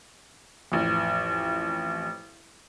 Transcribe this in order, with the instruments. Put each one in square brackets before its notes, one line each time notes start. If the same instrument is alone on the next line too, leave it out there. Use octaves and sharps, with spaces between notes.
[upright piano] A1 F2